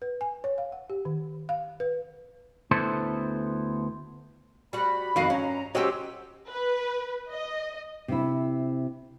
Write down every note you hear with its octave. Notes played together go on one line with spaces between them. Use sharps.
B4
G#5
C#5
F5
F#5
G4
D#3
F5
B4
D2 B3 E4 A4 C5
G3 F#4 B5
F2 D#3 F#4 D#5 F5
G2 C#4 A#5
C#4 F#4 G4 C5 C#5 D#5 E6
B4
D#5
C3 E4